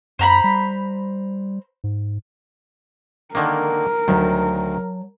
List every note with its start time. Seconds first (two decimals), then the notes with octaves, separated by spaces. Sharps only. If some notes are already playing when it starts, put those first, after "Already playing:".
0.19 F#2 C5 A#5 B5
0.44 G3
1.84 G#2
3.35 D3 D#3 A#3 A#4
4.08 D2 D#3 F#3 A5